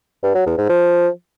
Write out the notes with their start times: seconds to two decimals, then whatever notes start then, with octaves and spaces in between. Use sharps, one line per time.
0.23 G2
0.35 F#3
0.46 E2
0.58 G#2
0.69 F3